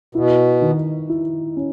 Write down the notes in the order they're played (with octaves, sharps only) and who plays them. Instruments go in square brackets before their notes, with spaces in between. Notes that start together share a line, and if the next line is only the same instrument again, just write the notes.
[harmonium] B2 [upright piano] E4
[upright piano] D#3
E4
C#4